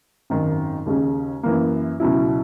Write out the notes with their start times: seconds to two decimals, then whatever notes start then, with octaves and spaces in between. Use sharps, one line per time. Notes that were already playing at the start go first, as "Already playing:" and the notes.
0.30 G#1 F#2 D#3
0.86 D#2 C#3 G#3 C#4
1.43 F#2 E3 A#3
2.00 C#2 B2 F#3 C#4 E4